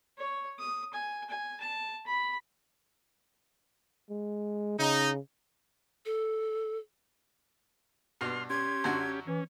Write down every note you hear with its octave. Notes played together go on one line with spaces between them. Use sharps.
C#5
D#6
G#5
G#5
A5
B5
G#3
C#3 D#4
A4
G2 B2 C6 F6
C#4 G4 C6 G#6
F#2 D3 F#4
E3 C#4